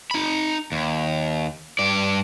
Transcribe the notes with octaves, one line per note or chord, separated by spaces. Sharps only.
D#4 B5
D#2
G2 D5